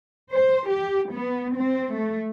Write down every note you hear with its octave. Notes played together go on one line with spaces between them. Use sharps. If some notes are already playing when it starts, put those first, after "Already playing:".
C5
G4
B3
C4
A3